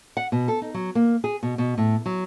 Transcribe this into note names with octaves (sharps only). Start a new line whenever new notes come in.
F#5
B2
A4
D#4
F#3
A#3
G#4
B2
B2
A2
F#3